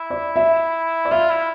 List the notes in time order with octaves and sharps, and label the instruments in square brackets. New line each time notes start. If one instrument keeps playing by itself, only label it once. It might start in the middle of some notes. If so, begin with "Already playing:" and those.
Already playing: [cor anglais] E4
[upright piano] D5
E5
D5
[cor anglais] F4 [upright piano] E5
[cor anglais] E4